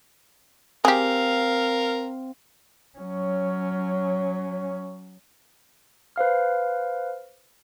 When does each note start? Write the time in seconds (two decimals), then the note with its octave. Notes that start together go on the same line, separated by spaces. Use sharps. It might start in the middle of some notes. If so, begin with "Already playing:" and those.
0.85 C4 G4 G#4 A#4 F5
2.98 F#3 C#4
6.16 B4 C5 F5 F6